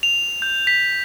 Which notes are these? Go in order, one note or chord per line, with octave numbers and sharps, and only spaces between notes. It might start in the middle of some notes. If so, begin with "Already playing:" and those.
F7
G6
B6